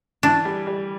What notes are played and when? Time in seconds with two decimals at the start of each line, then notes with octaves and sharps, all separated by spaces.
0.23 E3 D4
0.45 G3
0.67 G3